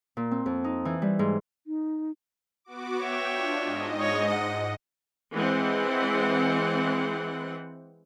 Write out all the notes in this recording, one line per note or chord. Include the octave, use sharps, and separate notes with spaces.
A#2
C4
F2
D#4
E3
G3
G#2
D#4
B3 F#4 D6
C#5 E5 G5
D4 F4
G#2 D#5
C#5
F#5
E3 G#3 C4 F#5